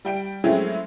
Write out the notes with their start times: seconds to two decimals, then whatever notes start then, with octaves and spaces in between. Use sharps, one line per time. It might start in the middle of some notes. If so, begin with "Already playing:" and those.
0.05 G3 G5 D7
0.44 F#3 G#3 A3 C4 C#4 E4